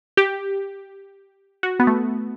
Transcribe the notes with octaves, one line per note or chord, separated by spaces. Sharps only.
G4
F#4
B3
A3